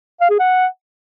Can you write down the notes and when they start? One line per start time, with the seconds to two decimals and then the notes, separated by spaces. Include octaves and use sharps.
0.21 F5
0.30 G#4
0.39 F#5